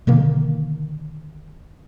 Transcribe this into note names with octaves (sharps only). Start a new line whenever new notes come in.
B2 D3 D#3 A#3